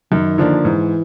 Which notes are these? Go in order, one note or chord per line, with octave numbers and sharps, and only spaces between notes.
F#2 D#3
D3 F3 A#3 D4
G#2 E3